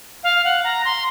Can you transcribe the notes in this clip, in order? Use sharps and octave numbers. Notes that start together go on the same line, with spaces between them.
F5
F#5
A#5
C6